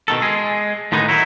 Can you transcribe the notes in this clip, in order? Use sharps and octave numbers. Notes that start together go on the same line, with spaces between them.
B2 D#3 A4
G#3 G#4
A2 D#3 G#3 B3 D#4
F#3 D#4 E4